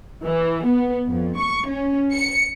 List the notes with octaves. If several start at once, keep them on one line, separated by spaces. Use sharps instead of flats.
E3
B3
F2
C#6
C#4
C#7